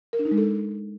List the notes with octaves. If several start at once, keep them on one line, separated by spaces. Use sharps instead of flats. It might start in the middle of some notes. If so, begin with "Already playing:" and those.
A#4
D4
D#4
G#3
A4